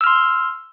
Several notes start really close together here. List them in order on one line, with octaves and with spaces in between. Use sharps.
E6 F6 C6